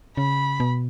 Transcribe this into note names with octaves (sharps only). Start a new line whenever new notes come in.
C#3 B5
B2